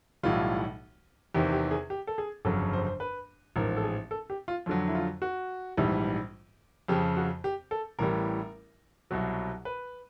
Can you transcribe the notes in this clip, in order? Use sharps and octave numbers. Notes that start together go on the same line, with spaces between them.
B1 A2 E3 G3 F4
E2 C3 D#3 G4
G4
G#4
G4
A4
G#4
G1 F2 C#3 F#3 A4
C5
C5
B4
A1 G#2 F3 A#4
A4
G#4
A4
G4
F4
F2 D3 F#3 F4
E4
F4
F#4
A#1 G#2 E3 G3
F2 C#3 F3 G4
F#4
G4
A4
A1 A2 E3 G3 A#4
C2 B2 F#3
B4